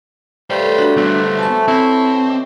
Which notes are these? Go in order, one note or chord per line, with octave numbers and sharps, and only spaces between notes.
G3 A3 F4 B4 C5
F#3 D4 F#4
G3 A3 B3 C5 F#5
E3 A4 A5 C#6
C4 E4 C#5
D#5 D6